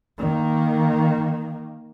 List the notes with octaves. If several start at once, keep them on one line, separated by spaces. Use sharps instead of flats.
D#3 A#3